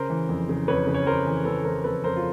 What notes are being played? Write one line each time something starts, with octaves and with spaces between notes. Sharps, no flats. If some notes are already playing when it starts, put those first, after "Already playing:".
Already playing: C#3 A#4 C5
E3
F2
C#3
F2 B4 C#5
C#3
C#5
F2 A#4 C5
E3
C#3 A4 B4
E3 A#4 C5
F2 A4 B4
F2 A#4 C5
F4